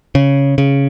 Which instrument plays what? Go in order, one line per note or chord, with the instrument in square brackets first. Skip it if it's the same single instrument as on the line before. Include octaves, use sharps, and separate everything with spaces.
[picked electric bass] C#3
C#3